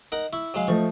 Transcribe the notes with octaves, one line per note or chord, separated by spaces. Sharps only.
D#4 A#4 F#5
E4 C#6
F#3 G#3 F5
F3 A3 D#5 C#6